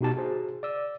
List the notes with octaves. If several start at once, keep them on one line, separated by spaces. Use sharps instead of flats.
B2 D#4 G4 A5
F#4 G#4 C5
D5 E6